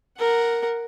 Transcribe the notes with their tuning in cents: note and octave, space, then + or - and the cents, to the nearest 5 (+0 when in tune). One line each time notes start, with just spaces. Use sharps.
A#4 +0 F#5 +0